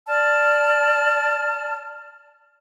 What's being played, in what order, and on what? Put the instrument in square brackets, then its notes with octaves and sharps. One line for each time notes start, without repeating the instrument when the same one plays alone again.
[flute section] D5 A5 F6